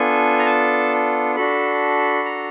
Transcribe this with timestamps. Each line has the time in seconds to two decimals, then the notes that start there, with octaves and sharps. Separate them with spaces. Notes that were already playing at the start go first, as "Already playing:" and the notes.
Already playing: B3 D4 F4 A4 G#5
0.39 A#5
0.46 A5
1.36 D4 F#4 A4 B5
2.25 A#5